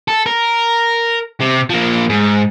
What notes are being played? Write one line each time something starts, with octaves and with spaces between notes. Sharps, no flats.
A4
A#4
C3
F3 A#3
G#2